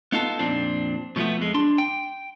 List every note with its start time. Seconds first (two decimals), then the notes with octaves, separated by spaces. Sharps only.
0.12 B3 D#4 F4 A4
0.39 F2 A#2 C4 D4
1.16 B2 F3 G3 A3 B3
1.38 F2 G#3
1.54 D4 C6
1.78 G5